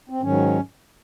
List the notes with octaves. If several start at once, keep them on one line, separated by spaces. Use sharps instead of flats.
C4
G#2 D#3 F#3 C#4